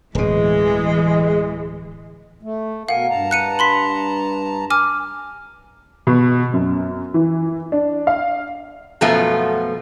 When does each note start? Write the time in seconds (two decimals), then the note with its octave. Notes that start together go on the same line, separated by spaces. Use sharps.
0.15 D1 B2 E3 G#3
2.43 A3
2.89 B2 A#4 F5 F#5 G#5
3.10 G2 A5 A#5
3.31 F#6 C#7 D#7
3.59 B5 C6 B6
4.70 G#5 D6 F6
6.07 B2
6.53 F#2
7.14 E3
7.72 D4
8.07 F5
9.01 F#2 B2 F3 A3 B3 F4